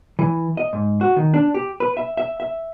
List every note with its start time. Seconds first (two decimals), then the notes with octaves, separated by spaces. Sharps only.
0.19 E3
0.57 D#5
0.73 G#2
1.01 F#4
1.16 D#3
1.34 D4
1.54 G4
1.80 B4
1.97 E5
2.17 E5
2.40 E5